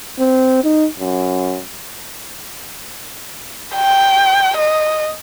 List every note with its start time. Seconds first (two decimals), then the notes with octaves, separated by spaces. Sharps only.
0.20 C4
0.64 D#4
0.99 F#2
3.75 G5
4.57 D#5